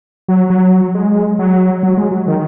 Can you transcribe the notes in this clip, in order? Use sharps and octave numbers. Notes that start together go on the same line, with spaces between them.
F#3
F#3
G#3
F#3
F#3
G#3
F#3
D#3